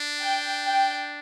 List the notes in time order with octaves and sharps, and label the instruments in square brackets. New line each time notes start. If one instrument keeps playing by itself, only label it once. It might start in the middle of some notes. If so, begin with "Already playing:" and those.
Already playing: [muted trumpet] D4
[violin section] G5
G5